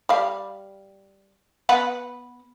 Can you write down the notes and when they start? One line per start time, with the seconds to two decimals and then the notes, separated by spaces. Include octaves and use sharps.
0.09 G3 F5
1.69 B3 B4 F#5